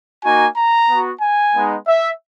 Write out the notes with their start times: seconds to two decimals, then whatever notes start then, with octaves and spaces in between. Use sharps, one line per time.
0.24 A#3 D#4 F#4 G#5
0.56 A#5
0.89 B3 F#4
1.22 G#5
1.54 G#3 B3 D#4
1.87 E5